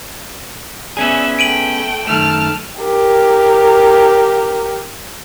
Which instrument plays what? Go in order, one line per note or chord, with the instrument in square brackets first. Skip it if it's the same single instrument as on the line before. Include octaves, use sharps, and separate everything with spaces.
[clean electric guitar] B3 C#4 G#4 [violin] D5 E5
[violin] A3 G5 [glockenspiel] D7 D#7 F#7
[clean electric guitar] F#2 D#3 A3 [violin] A5 F6
[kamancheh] G4 A#4